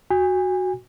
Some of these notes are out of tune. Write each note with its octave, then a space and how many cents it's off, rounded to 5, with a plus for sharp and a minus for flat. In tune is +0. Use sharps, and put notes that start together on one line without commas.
F#4 +0 G#5 -30